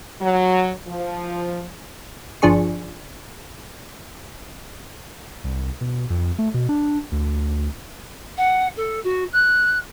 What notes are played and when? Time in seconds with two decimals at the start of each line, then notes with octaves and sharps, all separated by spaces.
0.21 F#3
0.88 F3
2.42 G1 F3 D4 G#4 C#6
5.44 C2
5.81 B2
6.10 F2
6.39 A3
6.54 B2
6.69 D4
7.12 D2
8.38 F#5
8.77 A4
9.04 F#4
9.33 F#6